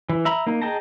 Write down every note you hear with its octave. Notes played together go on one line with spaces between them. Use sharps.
E3
E5 A#5 B5
A#3 D#4
G#4 D#5 G5 A5 A#5